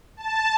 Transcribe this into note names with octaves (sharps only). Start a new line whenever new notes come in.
A5